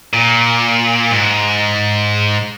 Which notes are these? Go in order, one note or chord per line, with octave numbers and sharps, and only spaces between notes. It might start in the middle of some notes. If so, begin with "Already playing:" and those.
A#2
G#2